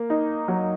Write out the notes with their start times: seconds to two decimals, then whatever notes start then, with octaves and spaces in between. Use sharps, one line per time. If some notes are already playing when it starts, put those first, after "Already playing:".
Already playing: A#3
0.10 D#4
0.48 F#3